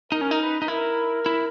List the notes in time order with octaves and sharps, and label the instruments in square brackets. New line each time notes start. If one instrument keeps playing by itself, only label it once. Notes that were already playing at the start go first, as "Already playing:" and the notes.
[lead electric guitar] D#4 [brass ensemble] A#4
[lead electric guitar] C#4
D#4
[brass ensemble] B4
[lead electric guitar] D#4
[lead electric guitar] E4 [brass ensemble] A#4
[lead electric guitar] E4